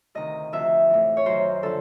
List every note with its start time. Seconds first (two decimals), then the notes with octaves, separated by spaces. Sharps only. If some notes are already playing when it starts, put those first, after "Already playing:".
0.15 D2 C3 D#3 D#5
0.52 D2 C3 F3 E5
0.90 A2 E3
1.17 C#5
1.26 F#2 D#3 C5
1.63 D3 F3 A4